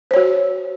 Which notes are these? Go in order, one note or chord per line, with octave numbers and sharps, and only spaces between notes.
F#4 C5 C#5